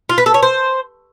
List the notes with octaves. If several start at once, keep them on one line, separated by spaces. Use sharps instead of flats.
F4
B4
A4
C#5
C5